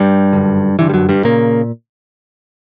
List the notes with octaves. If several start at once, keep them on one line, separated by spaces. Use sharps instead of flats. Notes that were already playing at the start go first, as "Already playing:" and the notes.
Already playing: G2 G3
F#2 D3
G2 D3 E3
G3
F#2 F#3
G2 G3
A#2 C#3 A#3